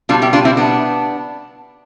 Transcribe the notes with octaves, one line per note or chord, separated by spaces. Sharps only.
B2 G3 D4 F4
E4 G4
D4 F4
C4 E4
B3 D4